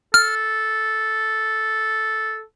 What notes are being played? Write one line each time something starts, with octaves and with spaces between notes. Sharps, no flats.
A4 F6